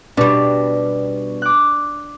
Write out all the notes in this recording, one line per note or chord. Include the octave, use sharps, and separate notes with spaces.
B2 G3 D4
D6 F#6